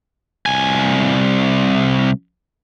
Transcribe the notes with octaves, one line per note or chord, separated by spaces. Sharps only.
C2 G#5